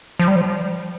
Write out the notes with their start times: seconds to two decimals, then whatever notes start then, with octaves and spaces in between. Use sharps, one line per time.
0.19 F3
0.28 G3
0.35 F3